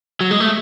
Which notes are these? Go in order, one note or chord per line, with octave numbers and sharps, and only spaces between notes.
F#3
G#3
A3